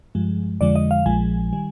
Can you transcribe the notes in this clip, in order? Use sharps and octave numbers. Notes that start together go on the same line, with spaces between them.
G2 F3 G#3
F2 D3 F3 G#3 D5
D#5
F5
A#1 A#2 F3 G#3 G#5
D#3 G3